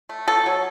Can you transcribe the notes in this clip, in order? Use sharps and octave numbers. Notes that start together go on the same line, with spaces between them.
A3
B2 A4
F#3